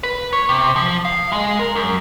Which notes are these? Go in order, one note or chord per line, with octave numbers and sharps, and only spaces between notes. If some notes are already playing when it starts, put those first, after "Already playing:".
B4
C#5
C3
F3
F5
G#3
A#4
F#2